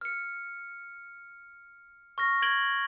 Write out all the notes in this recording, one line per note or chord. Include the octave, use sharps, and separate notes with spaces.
F6 C#7
C#6 F6 A#6
G#6 D7 F#7 G7